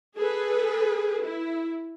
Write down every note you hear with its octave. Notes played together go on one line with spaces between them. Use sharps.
G#4 A4 B4
E4